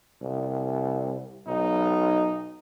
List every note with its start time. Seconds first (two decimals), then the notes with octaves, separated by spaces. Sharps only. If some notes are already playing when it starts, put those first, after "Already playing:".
0.21 C2
1.47 B1 D#4